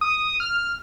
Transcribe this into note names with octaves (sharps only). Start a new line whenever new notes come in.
D#6
F6